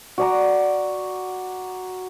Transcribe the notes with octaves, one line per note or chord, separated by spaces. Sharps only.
F#4 D5 A#5